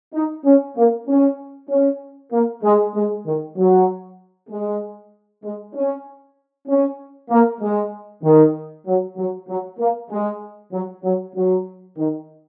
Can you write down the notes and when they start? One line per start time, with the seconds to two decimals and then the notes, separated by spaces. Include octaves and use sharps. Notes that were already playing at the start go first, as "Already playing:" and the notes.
0.14 D#4
0.45 C#4
0.77 A#3
1.08 C#4
1.70 C#4
2.32 A#3
2.63 G#3
2.94 G#3
3.26 D#3
3.57 F#3
4.50 G#3
5.44 G#3
5.75 C#4
6.68 C#4
7.30 A#3
7.61 G#3
8.24 D#3
8.87 F#3
9.17 F#3
9.48 F#3
9.79 A#3
10.10 G#3
10.72 F#3
11.03 F#3
11.36 F#3
11.97 D#3